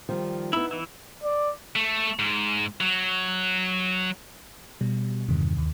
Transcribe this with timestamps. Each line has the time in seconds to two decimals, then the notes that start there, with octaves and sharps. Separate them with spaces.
0.09 D#3 F3 G3
0.53 B3 D#4 E4
0.71 E3 E4
1.24 D5
1.76 A3
2.19 G#2
2.80 F#3
4.81 B2 G3
5.29 E2 G2 C3 D#3
5.58 D#2